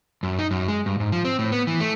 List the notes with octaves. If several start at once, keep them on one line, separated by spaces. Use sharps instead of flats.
F#2
D#4
F#2
G#3
G2
G#2
F3
C4
A2
B3
E3
A3